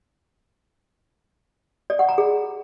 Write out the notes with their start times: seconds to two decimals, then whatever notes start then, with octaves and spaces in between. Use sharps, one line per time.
1.90 D5
1.99 F#5
2.09 A#5
2.18 G#4